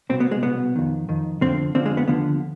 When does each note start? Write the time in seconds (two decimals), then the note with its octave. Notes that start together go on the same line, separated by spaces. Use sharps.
0.09 C2 B2 C4
0.20 B3
0.31 G#3
0.42 C2 B2 B3
0.76 F2 D#3
1.09 F2 D#3
1.41 F2 D3 F3 C4
1.75 F2 D3 F3 C4
1.86 G#3
1.97 B3
2.08 D#2 D3 F3 B3